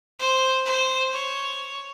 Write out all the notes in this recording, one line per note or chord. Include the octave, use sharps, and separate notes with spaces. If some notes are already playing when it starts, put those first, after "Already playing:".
C5
C5
C#5